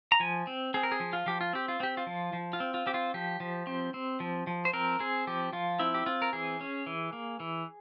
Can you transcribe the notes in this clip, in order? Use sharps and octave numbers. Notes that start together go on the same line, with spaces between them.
A#5
F3 G#5
C4
C4 G#4
A#4
G#4
F3
F4
F3 G4
F4
C4 G4
F4
C4 G4
F4
F3
F3
F4
C4
F4
C4 G4
F4
F3 G4
F3
C4
C4
F3
F3
C5
C4 A#4
C4 G#4
F3 G4
F3 F4
C4 E4
G4
C4 F4
A#4
E3 G#4
C#4
E3
A#3
E3